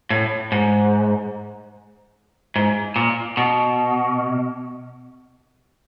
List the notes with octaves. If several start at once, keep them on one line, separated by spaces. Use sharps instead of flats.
A2
G#2
G#2
A#2
B2